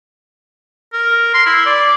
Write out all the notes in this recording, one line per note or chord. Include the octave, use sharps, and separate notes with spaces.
A#4
C6
E4
D5